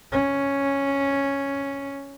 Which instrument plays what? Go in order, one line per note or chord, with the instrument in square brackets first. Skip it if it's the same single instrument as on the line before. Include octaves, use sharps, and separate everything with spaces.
[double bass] C#4